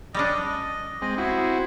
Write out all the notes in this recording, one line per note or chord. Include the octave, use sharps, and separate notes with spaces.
G3 C#4 D4 D#5
D#5
G#3 C4 D#5
C4 E4 F#4 G#4